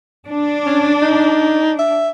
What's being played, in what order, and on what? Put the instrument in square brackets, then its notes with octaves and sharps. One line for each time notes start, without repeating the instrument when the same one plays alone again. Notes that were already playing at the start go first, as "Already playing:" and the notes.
[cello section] D4
[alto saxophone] C#4
D#4
E5